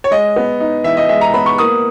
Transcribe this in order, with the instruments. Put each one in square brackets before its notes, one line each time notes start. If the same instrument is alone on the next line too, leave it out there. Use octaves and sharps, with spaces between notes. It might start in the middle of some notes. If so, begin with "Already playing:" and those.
[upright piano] C#5
G#3 D#5
B3
D#4
E3 E5
D#5
G#3 E5
A#5
B3 B5
C#6
A#3 D#6